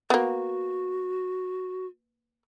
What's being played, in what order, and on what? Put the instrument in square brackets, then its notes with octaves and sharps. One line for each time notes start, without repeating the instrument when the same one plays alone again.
[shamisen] A#3 B3 [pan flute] F#4